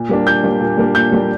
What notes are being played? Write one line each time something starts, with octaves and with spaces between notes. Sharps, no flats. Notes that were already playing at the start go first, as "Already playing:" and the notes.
Already playing: A#2
G3 A#3 D4
A#2 G6
G3 A#3 D4
A#2
G3 A#3 D4
A#2 G6
G3 A#3 D4